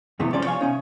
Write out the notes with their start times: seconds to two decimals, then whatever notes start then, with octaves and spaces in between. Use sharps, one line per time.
0.19 F2 C3 E3 A3 B3
0.33 C2 F3 G3 C#4 D5
0.46 C#5 F5 G#5
0.61 C3 C#4 D#4